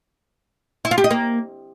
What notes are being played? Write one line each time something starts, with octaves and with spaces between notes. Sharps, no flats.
E4
F4
G4
D#5
A#3